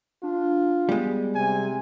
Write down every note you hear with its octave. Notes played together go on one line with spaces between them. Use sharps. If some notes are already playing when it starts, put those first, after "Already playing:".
D4 F4
G3 G#3 B3
C3 G#5